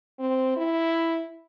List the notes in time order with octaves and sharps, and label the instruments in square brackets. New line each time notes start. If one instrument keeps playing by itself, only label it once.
[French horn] C4
E4